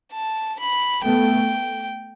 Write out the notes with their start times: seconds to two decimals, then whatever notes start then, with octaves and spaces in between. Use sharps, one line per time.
0.13 A5
0.59 B5
1.04 A3 B3 G5